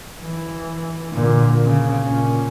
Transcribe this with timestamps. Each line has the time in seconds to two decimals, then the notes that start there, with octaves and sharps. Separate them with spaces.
0.20 E3
1.10 A#2 D3
1.65 C#3
2.04 A#2 C#4